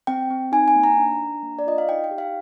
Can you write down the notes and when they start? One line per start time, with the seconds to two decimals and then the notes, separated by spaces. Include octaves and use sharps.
0.07 C4 G5
0.30 C4
0.52 D#4 G#5
0.68 G#5
0.76 A#3
0.84 A#5
0.98 D4
1.21 D4
1.43 A#3
1.59 D5
1.66 F4 D#5
1.78 F5
1.89 D#4 G5
2.04 G5
2.11 G4
2.18 F5